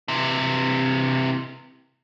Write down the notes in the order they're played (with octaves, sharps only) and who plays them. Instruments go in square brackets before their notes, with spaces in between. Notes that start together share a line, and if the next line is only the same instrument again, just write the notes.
[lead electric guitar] C3 E3